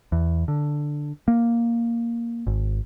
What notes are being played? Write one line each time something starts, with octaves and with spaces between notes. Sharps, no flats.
E2
D3
A#3
G#1